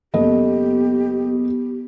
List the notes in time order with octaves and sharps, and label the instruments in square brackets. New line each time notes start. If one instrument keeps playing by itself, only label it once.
[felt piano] F#1 A4 D#5 [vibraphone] B3 [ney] G4